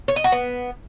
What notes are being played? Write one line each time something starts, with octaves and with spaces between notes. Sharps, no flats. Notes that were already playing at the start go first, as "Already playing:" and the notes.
C#5
D#5
F#4
B3